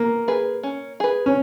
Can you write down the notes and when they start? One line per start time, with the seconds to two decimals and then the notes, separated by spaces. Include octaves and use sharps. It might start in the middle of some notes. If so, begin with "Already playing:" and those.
Already playing: A#3
0.28 G#4 B4
0.63 C#4
1.00 G#4 B4
1.26 C#4